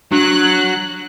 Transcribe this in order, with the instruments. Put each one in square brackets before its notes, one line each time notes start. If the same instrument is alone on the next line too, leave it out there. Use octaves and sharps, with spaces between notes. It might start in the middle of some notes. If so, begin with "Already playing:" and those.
[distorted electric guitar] F#3 [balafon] D4 [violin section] F#6